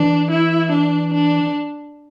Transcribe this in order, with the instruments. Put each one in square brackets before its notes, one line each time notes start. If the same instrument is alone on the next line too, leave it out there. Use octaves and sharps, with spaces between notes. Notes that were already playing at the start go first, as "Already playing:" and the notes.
Already playing: [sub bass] E3 [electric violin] D4
[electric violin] E4
D4
D4